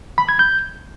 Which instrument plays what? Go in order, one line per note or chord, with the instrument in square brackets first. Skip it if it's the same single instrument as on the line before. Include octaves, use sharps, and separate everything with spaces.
[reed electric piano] B5
G#6
G6